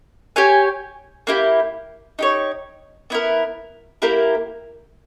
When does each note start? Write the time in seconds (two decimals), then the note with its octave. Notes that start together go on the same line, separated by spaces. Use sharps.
0.36 G4 C#5 G#5
1.27 A#3 E4 G4
2.19 D#4 G4 C#5
3.10 B3 E4 A#4
4.02 A#3 E4 G4 A#4